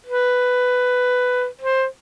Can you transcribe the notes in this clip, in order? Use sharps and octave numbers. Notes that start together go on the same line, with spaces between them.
B4
C5